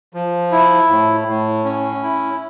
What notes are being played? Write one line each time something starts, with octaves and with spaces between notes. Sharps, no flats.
F3
E4
A2
A2
C#4
E4